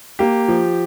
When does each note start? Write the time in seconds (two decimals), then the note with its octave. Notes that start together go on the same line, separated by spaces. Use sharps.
0.19 A#3 G4
0.48 F3